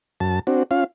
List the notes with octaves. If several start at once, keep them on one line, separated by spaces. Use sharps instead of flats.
F#2 A5
C4 D4 F#4
C#4 F4 F5